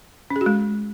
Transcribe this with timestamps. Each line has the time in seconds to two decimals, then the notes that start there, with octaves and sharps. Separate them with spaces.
0.30 C#4
0.36 G#4
0.41 F#4
0.46 G#3